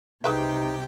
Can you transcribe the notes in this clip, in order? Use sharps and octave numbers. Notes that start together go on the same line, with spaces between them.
C2 C3 D#4 G4 G#4 B4 E5 G5